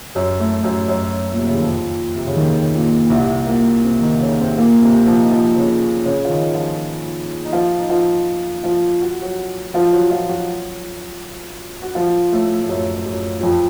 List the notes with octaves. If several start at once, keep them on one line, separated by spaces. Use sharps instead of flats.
F#2 F#3
A2 A3
F#2 F#3
F#2 F#3
A#2
C3
C#3
D#3
F2 F3
C3
C#3
D#2 D#3
A#2
A#2
C2 C3
A#2 A#3
C3 C4
D#3 D#4
C#3 C#4
C3 C4
A#2 A#3
C3 C4
F3 F4
D#4
F3 F4
C#3 C#4
C#3 C#4
F4
D#3 D#4
F3 F4
D#4
F3 F4
D#4
F3 F4
F3 F4
F#4
F#3 F#4
F3 F4
F#3 F#4
F3 F4
F#3 F#4
F#4
F3 F4
A2 A3
A3
F#2 F#3
F#2 F#3
F#3
F2 F3